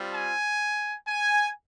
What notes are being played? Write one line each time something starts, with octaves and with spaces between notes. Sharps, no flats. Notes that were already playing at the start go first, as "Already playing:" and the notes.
Already playing: G3 C4 F4
G#5
G#5